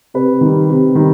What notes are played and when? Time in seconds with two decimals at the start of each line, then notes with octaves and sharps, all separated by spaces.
0.14 C3 B4
0.41 D#3 G3
0.69 C3
0.95 D#3 G3